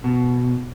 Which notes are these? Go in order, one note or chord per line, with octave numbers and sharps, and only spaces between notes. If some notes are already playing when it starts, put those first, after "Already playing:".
B2